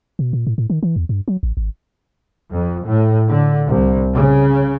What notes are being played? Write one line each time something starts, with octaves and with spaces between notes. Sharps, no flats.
B2
A#2
A2
A2
D#3
E3
E2
G2
F#3
A1
G#1
F2
A2
D3
C2
C#3